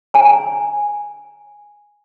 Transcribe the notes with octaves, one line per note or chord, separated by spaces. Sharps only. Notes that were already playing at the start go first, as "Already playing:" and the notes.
G#5 A#5